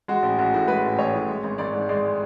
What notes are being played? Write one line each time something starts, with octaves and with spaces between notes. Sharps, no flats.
G#3 F#4
A1
A1 F#4
A2 F#4
G#3 B4
A1
A1 C#5
A2
G#3
G#1
G#1 D5
G#2
G#3 D5